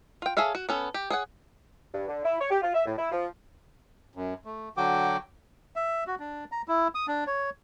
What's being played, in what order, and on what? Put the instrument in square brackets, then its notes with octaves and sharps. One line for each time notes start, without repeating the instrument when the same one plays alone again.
[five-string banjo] F4 G5
G#4 A4 C#5 E5 F5
F#4
B3 C#4 A4
G4
G#4 C#5 F#5
[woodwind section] G2
D3
E4
C#5
G4
F4
E5
A2
E4
F3
[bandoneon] F#2
A3
D3 F#3 F#4 G5 D6
[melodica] E5
F#4
D4
A#5
E4
D#6
D4
C#5